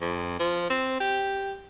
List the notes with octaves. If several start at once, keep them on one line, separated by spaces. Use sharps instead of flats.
F2
F3
C4
G4